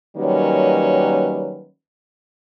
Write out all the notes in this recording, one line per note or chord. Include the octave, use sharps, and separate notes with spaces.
D#3 F#3 G3 A#3 C#4 B4